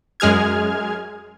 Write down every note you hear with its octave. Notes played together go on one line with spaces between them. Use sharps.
F#2 G#3 G#4 F6 G#6